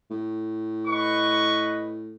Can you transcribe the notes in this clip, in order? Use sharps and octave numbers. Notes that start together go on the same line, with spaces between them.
A2
B4 D#5 C#6